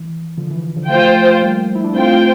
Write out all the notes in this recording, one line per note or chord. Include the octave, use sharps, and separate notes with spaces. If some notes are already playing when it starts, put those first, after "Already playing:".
Already playing: E3
D3 F3
E3
F3
E3
D3 F3
F3 A3 F4 C5 G5
G3 A#3
E4
D4
A3 C4 F4 C5 G5